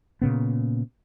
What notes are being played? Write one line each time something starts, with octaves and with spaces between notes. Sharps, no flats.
A#2 C#3 B3